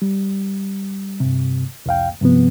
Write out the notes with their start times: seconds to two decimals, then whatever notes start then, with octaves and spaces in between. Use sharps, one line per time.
0.02 G3
1.20 G2 C3
1.86 C2 F2 F5 G5
2.21 G2 C3 F3 B3